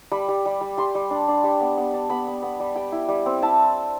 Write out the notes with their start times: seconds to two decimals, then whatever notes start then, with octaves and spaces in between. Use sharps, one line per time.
0.12 G3 B5
0.29 G3
0.46 G3
0.61 G3
0.78 G3 C6
0.95 G3
1.11 D4
1.28 D4
1.44 G3
1.60 B3
1.77 B3
1.94 D4
2.10 B3 B5
2.27 B3
2.43 B3
2.60 G3
2.76 G3 G5
2.92 E4
3.09 G3
3.26 C4
3.42 E4 A5